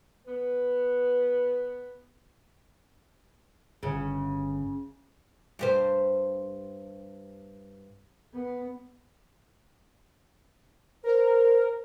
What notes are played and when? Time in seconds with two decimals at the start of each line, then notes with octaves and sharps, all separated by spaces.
0.27 B3 B4
3.83 G1 C#3
5.59 G2 G4 C5
8.34 B3
11.04 A#4 C5